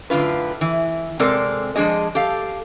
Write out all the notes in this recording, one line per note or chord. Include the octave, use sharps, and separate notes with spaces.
F#2 A2 D3 F4 B4
E3
C3 G#3 C4 A4 A#4 D5
F3 G#3 D4 G#4 D#5
G4 A4 F5